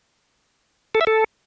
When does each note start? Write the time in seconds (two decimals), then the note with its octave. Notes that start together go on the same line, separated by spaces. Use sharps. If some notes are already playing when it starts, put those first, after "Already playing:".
0.95 A4
1.01 E5
1.07 A4